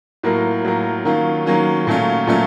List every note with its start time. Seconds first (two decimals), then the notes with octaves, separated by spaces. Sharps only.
0.23 A2 F#3 A#3 F4 A#4
0.64 A2 F#3 A#3 F4 A#4
1.05 D#3 F#3 A#3 C#4 F4
1.46 D#3 F#3 A#3 C#4 F4
1.87 A#2 F#3 A3 C#4 F4
2.27 A#2 F#3 A3 C#4 F4